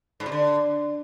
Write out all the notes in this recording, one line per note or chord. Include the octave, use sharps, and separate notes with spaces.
G#2
C3
D3